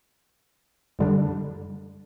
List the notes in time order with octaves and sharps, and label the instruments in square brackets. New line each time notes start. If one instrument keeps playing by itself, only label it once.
[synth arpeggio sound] F#2 D3 G3 D4